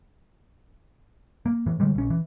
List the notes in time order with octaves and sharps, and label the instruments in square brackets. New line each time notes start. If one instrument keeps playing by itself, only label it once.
[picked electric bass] A#3
A2 E3
D3 G3 G#3
A#1 C#4
E3